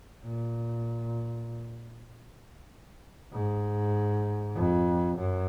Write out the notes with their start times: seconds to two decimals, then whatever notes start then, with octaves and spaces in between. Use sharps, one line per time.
0.24 A#2
3.32 G#2
4.55 F2
5.18 F#2